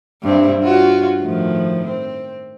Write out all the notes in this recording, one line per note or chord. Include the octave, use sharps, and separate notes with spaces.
G2 C4 E4
F4 F#4 C#5
A2 D#3 F3
C4